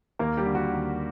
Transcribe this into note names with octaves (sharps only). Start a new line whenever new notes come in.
D#2 A#3 A#4
G3 G4
D3
F#4
D#2